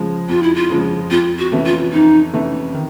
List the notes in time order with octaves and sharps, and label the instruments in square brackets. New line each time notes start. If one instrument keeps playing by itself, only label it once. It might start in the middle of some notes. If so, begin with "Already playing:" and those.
Already playing: [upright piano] C#3 F3 G#3
[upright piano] F2 [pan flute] F4
[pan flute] E4
F4
[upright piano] C#3 F3 G#3
[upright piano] F2 [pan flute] F4
[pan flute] F#4
[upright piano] C3 E3 A3 C#4
[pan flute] F4
[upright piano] F2 [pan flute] D#4
[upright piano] C3 E3 A3 C#4
D#3